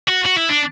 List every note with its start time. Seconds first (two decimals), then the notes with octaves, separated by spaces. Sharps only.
0.08 F#4
0.26 F#4
0.37 E4
0.49 D4